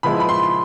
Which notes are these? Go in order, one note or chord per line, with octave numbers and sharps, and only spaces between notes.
A#2 F3 G#3 B3 E4 B5
B5
C6